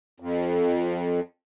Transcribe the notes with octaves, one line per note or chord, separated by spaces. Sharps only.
F2